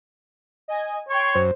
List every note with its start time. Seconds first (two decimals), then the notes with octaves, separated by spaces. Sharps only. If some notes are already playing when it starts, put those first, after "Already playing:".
0.68 D#5 G#5
1.09 C#5 G5 C6 C#6
1.35 F#2 C5